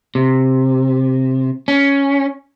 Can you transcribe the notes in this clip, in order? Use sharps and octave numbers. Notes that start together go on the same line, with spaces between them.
C3
C#4